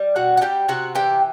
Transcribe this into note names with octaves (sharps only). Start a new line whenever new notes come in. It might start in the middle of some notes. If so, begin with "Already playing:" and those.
Already playing: G3
B2 F#4 F#5
F#5
G3 G4 G5
C3 F#4 F#5
E3 G4 G5